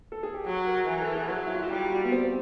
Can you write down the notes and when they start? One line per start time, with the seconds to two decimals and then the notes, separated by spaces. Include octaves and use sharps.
0.12 A4
0.23 G#4
0.34 G4
0.46 F#3 F#4
0.67 A#4
0.88 E3 A#4
1.02 A4
1.15 G#4
1.29 F#3
1.47 E4
1.55 F4
1.63 F#4
1.70 G3 G4
1.92 F#4
2.04 B3
2.12 C4